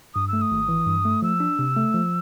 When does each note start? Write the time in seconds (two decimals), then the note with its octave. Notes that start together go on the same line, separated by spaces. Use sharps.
0.15 G2 D#6
0.28 A3 E6
0.42 D#6
0.51 G#1
0.69 E3
0.87 G2
1.05 A3
1.22 F3 E6
1.40 D4
1.59 C3
1.76 A3
1.94 F3